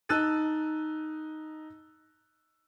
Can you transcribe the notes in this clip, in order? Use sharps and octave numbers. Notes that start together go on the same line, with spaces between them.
D#4 A5 E6 F#6 A6 D#7